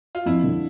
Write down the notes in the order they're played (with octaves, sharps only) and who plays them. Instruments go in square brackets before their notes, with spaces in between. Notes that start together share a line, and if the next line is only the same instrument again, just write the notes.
[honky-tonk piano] F4
[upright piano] F2 [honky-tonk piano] E4
[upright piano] D3